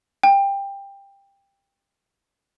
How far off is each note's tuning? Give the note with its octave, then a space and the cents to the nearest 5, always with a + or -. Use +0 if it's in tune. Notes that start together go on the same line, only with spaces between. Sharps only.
G5 +15